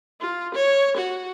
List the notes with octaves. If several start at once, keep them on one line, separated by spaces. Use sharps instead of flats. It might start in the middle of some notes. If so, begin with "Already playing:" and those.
F4
C#5
F#4